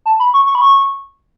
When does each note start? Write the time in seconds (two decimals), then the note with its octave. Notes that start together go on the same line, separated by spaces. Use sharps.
0.06 A5
0.20 B5
0.34 C#6
0.47 C#6
0.55 B5
0.61 C#6